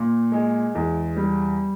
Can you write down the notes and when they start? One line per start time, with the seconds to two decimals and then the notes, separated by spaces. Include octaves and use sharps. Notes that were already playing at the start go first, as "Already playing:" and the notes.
Already playing: A#2
0.32 G#3
0.75 E2
1.17 G3